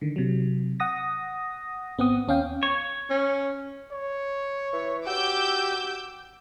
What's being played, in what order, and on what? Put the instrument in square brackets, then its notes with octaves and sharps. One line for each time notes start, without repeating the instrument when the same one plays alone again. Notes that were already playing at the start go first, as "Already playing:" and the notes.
[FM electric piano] D3 D#3
C3 F#3
F#5 D#6 A#6
G#1 B3 C4 F#5 D#6
D#2 C#4 F5 G5
[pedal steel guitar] C#5
[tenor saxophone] C#4
[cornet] C#5
[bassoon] E3
[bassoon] F#4 [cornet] G4 [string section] D6 E6 G6